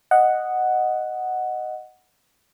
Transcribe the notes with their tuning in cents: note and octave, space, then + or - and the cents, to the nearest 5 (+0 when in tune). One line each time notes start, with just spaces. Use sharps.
D#5 -5 F#5 +0